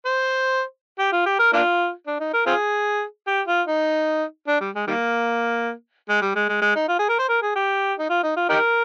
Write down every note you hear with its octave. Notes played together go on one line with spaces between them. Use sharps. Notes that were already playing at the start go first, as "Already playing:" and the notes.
C5
G4
F4
G4
A#4
A#3 D4 F4
D4
D#4
A#4
C4 F4 G#4
G4
F4
D#4
D4
G3
G#3
D#3 G3 A#3
G#3
G3
G#3
G#3
G#3
D#4
F4
G#4
A#4
C5
A#4
G#4
G4
D#4
F4
D#4
F4
D#4 G4 A#4